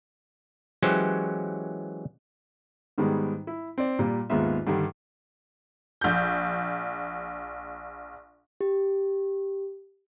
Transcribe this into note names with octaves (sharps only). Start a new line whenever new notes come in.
E3 F#3 G#3 C#4 G4 C5
G#2 D#3 G3 G#3 B3
E4
C4 D5
A#2 G3
D#2 G#2 G#3 B3 F4 E5
G2 D3 D#3 G3
A#1 G6
G4